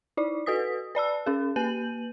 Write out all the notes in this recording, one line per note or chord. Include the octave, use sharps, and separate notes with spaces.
D#4 E4 D5
F#4 A4 B4 D#6 B6
B4 D5 A5 E6
C#4 G#4
A#3 B4 G6 D#7 F#7